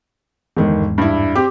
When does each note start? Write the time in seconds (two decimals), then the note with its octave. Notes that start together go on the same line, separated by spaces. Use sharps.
0.57 G1 E2 G#2 D#3
0.98 G2 E4
1.35 C4 G4